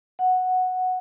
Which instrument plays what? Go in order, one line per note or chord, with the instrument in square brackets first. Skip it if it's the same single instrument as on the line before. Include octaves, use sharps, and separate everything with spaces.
[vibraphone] F#5